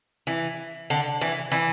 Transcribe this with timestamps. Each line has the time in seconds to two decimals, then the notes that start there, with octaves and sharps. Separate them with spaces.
0.27 E3
0.90 D3
1.21 E3
1.52 E3